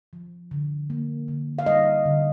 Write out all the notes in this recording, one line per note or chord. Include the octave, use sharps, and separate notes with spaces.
F3
D3
A#3
D3
F5
G3 D#5
D3